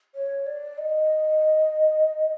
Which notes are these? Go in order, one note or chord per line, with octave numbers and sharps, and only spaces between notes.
C#5
D5
D#5